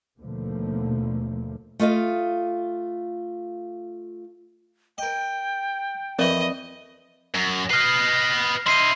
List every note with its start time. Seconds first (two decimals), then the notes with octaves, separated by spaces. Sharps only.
0.19 D#2 B2 D3 F3 A3 A#3
1.80 A3 F4 D#5 F5
4.98 A#4 D#5 G5
6.19 F2 E3 F3 C4 A#4 D5 D#5
7.34 F#2
7.70 B4 D#5 F6 C7
8.66 E4 D#5 C6 C7 D#7